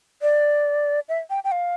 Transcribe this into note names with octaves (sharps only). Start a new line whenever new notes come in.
D5
E5
G5
G5
F5